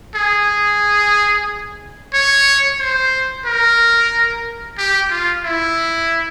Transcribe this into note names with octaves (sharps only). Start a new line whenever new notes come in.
G#4
C#5
C5
A#4
G4
F4
E4